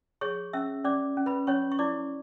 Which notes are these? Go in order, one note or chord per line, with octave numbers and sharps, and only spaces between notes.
G#4 C#5 C#6
C#4 E5 E6
C#4 D5 D6
C#4
B4 B5
C#4 C#5 C#6
C#6
E4 D5 D6